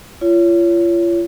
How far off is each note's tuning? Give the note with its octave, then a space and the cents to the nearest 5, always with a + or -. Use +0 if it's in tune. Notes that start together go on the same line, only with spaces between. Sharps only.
F4 -35 C#5 +25